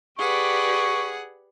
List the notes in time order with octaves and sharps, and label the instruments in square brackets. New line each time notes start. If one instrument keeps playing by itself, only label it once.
[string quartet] G4 B4 D5 [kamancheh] G#4 F#5 [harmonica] C#6